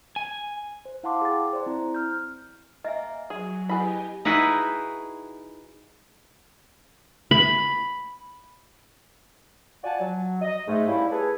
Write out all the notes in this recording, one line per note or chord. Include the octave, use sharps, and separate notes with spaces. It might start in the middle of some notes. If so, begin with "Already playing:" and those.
G#5
C5
E4 F5 F#5 A5 C6 D6
G#4 G5 A6
C5 D5 C6
C4 E4 A#5
F6 G6
A#3 D#5 E5 G#5
F#3 G#4
B3 E4 G4 G#4 D#5 G#5 B5
D#4 E4 F#4 G#4 B4
B5
F4 F#4 D5 F#5 G#5 A5
F#3
D#5
G#2 A3
G3 A#3 C#4 E4
G#4 A4 B4 C#5